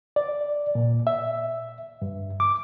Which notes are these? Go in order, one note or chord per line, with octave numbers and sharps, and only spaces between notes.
D5
A#2
E5
G2
D6